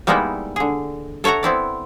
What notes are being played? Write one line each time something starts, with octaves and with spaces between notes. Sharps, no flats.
G3 G#3 A#3 B3 D#4 E4
D3 G#4
A4 C#5 E5 F#5 A#5
B3 C4 E4 D5